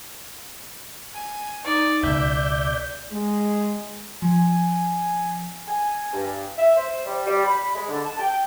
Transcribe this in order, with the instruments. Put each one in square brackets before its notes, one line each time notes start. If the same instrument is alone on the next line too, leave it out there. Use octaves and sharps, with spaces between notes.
[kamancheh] G#5
D#4 D5
[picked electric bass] C#2 B2 [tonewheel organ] D5 G6 [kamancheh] E5
[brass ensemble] G#3
[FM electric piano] F3 [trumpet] G#5
[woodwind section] G#5
G2
E5
C5
G3
G3
B5
G#3
D3
A5
G5